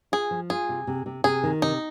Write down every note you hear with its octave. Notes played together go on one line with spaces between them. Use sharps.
F4 G#4
F3
F4 G#4
C3
C3
C3
C3 G#4
D#3
C3 D#4